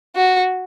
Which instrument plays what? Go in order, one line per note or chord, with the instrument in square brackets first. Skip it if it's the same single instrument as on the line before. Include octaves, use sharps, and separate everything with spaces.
[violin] F#4